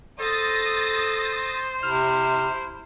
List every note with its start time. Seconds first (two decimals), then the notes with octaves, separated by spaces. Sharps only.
0.20 A4 C5 D#6 A6 A#6
1.83 C3 E4 F6